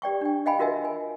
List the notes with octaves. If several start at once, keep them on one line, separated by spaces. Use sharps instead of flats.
G4 D5 G5 C#6
D4 G5
D#5 F5 G5 G#5 B5
F4 F#4 A#4 D#5 E5 G#5
G#5